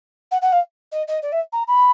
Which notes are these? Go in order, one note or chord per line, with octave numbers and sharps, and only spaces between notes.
F#5
F#5
F5
D#5
D#5
D5
E5
A#5
B5